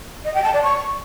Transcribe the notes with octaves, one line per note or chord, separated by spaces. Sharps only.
D#5
G5
A5
D5
C#6